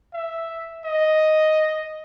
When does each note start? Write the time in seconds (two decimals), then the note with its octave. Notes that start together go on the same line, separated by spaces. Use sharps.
0.13 E5
0.85 D#5